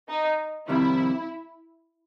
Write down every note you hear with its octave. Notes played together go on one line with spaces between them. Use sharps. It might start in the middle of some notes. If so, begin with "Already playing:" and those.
D#4
F2 C3 D#3 G3 E4